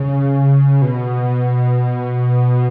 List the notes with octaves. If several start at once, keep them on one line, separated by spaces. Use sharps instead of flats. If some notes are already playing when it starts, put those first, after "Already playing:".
Already playing: C#3
B2